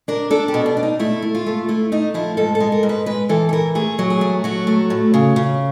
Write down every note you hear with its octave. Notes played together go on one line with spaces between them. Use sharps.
D4 A#4
D4 A4
G4
B2
D4
D4
D#4
A3 E4
A3
F4
A3
A3 E4
A3 D#4
F3 E4
G#2 A4
A4
G#3
A#4
G#2
B4
G#3 B4
E3 A4
A4
E3 A#4
A3 G#4
F#3
G#4
A3
F#3 F#4
A3
A2
C#3
C#3